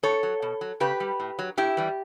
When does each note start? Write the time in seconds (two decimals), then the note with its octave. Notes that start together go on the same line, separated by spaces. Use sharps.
0.03 A2 A4 C#5
0.23 F#3
0.42 B2
0.61 F#3
0.80 C#3 G4 B4
1.00 G3
1.20 A2
1.39 F#3
1.57 A2 E4 G4
1.77 E3 G3